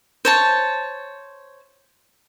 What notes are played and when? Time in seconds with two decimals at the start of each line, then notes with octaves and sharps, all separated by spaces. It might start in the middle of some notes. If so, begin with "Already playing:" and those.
0.25 C5 C#5 A5